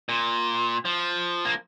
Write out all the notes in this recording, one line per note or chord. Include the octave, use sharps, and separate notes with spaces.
A#2
F3
A#3